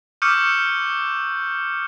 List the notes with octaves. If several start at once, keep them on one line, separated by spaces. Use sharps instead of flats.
C#6 D6 E6 F6 G6 C#7